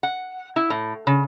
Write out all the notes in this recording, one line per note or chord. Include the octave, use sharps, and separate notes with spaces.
F#5
E4
A2
C#3